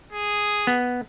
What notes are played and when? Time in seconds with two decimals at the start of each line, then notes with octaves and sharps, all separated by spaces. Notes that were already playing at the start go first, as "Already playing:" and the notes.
0.12 G#4
0.67 B3